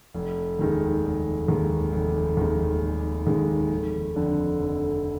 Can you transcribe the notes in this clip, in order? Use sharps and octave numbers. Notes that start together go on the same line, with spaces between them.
F1
D#2 D#3 G#3
F1
D#2 D#3 G#3
F1
D#2 D#3 G#3
F1
D#2 D#3 G#3
F1
F2 D3
F1